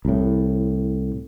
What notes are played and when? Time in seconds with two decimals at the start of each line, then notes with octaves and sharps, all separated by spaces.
0.05 C2 A2